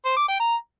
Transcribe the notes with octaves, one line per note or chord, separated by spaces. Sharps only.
C5
D6
G5
A#5